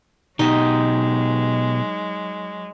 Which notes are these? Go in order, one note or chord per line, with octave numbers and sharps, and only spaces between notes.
B2 F#3 G#3 D#4 G4